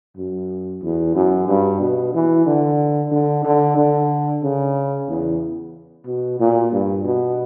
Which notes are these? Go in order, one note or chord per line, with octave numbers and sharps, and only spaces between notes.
F#2
E2
F#2
G2
B2
E3
D3
D3
D3
D3
C#3
E2
B2
A#2
G2
B2